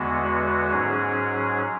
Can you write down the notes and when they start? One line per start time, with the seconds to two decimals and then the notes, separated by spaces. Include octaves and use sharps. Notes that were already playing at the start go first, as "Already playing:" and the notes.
Already playing: E2 D3 G#3 B3 F#4
0.71 G#2 F#3 C#4 G#4